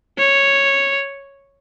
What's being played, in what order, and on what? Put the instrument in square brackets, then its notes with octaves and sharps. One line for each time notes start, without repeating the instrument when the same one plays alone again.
[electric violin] C#5